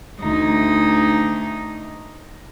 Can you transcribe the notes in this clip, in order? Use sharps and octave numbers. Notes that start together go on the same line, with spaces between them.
D2 D#4